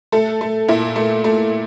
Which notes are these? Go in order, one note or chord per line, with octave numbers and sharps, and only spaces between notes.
A3 A4
A3
A#2 E4
A3
A3